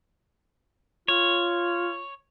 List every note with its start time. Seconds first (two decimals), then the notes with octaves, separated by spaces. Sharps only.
1.08 F4 C#5